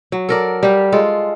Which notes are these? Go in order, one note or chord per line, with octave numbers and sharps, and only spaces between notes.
F#3
A4 A#4 D5
G3 G4
G#3 F4 A4